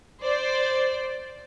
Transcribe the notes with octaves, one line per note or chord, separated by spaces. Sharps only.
C5 D5